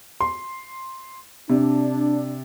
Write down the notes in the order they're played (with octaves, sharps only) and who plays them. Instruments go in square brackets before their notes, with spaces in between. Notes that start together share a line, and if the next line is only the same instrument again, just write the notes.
[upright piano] C6
[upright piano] C3 [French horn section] D4